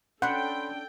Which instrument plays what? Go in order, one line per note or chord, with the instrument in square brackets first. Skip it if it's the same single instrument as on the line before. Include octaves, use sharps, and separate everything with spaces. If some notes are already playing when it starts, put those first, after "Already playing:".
[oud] C#4 D4 [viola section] A4 G5 [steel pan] F#5 [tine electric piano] B5 C6 G6